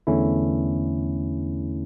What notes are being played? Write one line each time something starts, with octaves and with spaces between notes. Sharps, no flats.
E2 D3 A3 C#4 E4